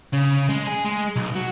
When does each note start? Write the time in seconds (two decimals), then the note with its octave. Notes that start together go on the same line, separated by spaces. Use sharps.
0.13 C#3
0.49 G#3
0.67 G#4
0.85 G#3
1.16 B1
1.36 F#3